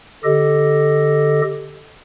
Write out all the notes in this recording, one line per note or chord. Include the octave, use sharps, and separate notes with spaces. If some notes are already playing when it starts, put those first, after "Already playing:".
D3 G4 A4 D#5